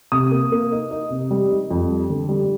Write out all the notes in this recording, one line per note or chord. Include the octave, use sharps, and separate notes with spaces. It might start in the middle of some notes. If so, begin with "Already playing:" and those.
C3 D#6
A#3
A#3
D#4
D#4
C3
G3
D#4
F2
G3
D3
G3